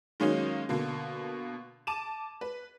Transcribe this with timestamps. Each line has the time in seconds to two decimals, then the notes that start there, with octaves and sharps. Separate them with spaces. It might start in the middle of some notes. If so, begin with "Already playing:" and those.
0.20 D#3 F#3 G#3 A#3 C#4 D#4
0.69 B2 D3 A#3
1.87 A5 D6 D#7 E7
2.41 B4